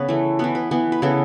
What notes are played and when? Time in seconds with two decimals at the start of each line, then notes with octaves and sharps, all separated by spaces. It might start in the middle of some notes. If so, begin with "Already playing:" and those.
Already playing: C#3 B3 B4 C#5
0.09 E3 A3
0.39 E3 B3 B4
0.55 B4
0.71 E3 B3
0.92 B4
1.02 C#3 E3 B3 A4